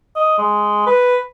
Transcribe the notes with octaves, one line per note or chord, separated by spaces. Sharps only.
D#5
G#3
B4